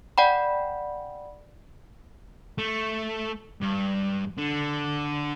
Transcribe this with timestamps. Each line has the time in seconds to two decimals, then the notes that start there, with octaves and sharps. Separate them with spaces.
0.18 D5 F#5 G5 B5
2.58 A3
3.61 G2
4.37 D3